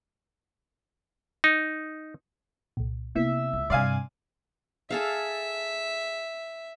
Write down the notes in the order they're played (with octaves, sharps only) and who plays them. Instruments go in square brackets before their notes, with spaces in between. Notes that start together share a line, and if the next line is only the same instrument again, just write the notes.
[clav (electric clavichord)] D#4
[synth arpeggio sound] C2 A#2
[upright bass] C3 [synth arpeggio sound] A#3 B3 E4 [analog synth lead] E5
[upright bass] C#2
[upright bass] G2 C3 [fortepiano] D5 F5 G#5 [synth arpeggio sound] C6 C7 D#7
[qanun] G#4 A4 F5 [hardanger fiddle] E5